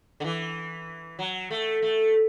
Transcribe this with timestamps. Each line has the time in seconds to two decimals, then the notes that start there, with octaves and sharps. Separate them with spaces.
0.20 D3
0.24 E3
1.19 F#3
1.51 A3
1.82 A3